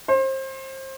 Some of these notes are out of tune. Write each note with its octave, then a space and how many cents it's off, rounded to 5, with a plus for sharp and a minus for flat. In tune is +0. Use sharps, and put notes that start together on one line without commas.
C5 +30